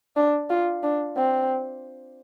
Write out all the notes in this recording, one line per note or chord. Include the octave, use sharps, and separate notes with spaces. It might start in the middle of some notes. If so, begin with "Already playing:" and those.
D4
F4
D4
C4